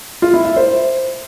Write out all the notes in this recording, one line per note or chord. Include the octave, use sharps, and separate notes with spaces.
F4
E4
E5
C5